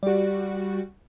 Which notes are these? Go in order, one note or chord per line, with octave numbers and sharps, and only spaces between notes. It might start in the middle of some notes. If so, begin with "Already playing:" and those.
G3 F#4 G4 D5